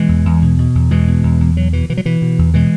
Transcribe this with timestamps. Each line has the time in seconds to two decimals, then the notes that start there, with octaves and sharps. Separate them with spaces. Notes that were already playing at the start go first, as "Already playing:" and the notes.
Already playing: B2 E3 G#3
0.09 E2
0.25 E2
0.42 B2
0.58 B2
0.75 E2
0.91 B2 E3 G#3
1.08 B2
1.23 E2
1.41 E2
1.57 B2 F#3
1.73 B2 E3
1.89 B2 E3
1.97 F#3
2.05 B2 E3
2.22 B2
2.39 E2
2.54 B2 E3 G#3